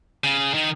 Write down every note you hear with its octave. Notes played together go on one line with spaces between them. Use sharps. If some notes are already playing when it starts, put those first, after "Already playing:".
C#3
D#3